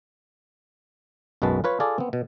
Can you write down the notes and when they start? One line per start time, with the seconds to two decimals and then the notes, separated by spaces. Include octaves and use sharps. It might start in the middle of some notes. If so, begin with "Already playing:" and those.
1.42 B1 F#2 G#3 F#4 B4 A5
1.64 F4 B4 C#5
1.80 F4 G#4 A4 D5
1.98 B3 C4
2.13 B2